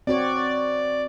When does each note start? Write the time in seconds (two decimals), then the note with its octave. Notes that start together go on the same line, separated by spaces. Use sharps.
0.07 C4 F#4 C#5 D5